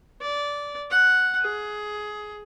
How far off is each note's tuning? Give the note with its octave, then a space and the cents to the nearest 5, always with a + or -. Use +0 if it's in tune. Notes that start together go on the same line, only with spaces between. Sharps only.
D5 -15
F#5 +0
G#4 +15